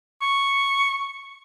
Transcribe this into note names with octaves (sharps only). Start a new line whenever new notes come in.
C#6